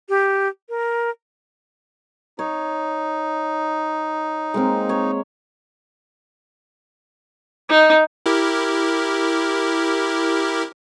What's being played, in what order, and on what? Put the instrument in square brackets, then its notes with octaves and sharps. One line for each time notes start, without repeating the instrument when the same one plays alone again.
[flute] G4
A#4
[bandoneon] D#4 [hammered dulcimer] C#5
[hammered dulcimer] G#3 A#3 C4
C#5
[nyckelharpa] D#4
[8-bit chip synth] E4 G4 A#4